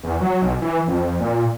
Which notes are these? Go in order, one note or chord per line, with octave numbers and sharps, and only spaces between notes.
E2
F#3
B1
E3
F2
A#2